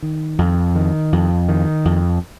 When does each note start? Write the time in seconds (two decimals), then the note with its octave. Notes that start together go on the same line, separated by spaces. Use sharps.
0.02 D#3
0.39 F2
0.75 D#3
1.13 F2
1.49 D#3
1.85 F2